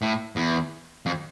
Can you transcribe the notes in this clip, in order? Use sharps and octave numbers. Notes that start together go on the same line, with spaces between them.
A2
E2
F2